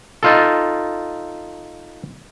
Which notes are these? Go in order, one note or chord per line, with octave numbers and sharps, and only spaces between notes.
D#4 F4 A4